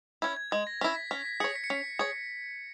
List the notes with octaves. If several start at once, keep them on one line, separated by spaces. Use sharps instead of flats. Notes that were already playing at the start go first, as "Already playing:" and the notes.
C#4 E4 G#6
G#6
G#3 G#6
A#6
C#4 E4 B6
B6
C#4 B6
B6
G#4 C#5 C#7
B6
C#7
C#4 B6
G#4 C#5